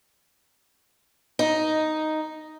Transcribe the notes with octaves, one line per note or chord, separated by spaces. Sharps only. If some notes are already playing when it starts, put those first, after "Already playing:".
D#4